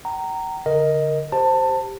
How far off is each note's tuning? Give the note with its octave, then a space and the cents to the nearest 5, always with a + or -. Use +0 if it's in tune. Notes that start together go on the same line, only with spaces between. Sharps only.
G5 -45 A#5 -10
D3 -25 A#4 +0 D#5 +5
G4 +0 C5 +0 A5 +20